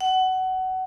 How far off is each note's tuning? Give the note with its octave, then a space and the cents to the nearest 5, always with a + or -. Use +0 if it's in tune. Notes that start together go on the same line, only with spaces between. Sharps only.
F#5 +20